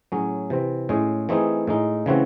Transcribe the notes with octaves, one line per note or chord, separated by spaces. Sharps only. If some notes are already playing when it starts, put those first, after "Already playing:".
A2 F#3 C#4 G#4
C3 E3 C4
A2 G#3 C#4 G#4
E3 A3 C4 D#4 G#4
A2 G#3 D#4
C#3 E3 A3 C4 F#4